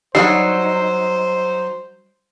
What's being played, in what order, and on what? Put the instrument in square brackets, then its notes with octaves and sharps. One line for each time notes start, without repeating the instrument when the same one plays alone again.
[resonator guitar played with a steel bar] F#3 D#4 [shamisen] G3 D4 F#5 [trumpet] C5 [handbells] E6 C7